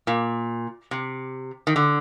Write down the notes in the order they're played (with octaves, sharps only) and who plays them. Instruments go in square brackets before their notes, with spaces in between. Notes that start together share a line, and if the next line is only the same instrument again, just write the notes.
[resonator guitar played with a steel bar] A#2
C3
D#3
D3